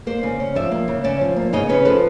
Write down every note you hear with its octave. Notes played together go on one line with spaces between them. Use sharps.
A#3 C5 D5
C#3
C#4
F3 D5 E5
A#3
C#3
C#4 D5 E5
F3
A#3
C#3 C#5 D#5
C#4 B4 C#5
F3 A4 B4